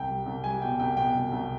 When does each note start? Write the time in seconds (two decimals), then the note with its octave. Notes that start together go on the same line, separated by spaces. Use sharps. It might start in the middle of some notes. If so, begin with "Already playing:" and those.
Already playing: C2 G5
0.09 G3
0.26 C2
0.44 G3 G#5
0.62 B2 G5
0.79 C2 G5
0.97 B2 G5
1.15 C2
1.32 C2